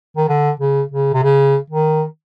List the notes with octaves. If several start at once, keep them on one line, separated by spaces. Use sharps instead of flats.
D#3
D3
C#3
C#3
C3
C#3
D#3